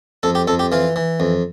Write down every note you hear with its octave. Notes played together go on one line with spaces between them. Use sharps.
F2 A4
G4
F2 A4
G4
E3 F4
E3
F2